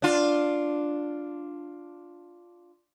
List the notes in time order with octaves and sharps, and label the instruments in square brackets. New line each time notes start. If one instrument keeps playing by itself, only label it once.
[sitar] D4 F4